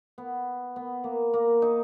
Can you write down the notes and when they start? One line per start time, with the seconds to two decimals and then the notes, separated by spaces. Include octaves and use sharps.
0.18 B3
0.76 B3
1.04 A#3
1.34 A#3
1.62 D#4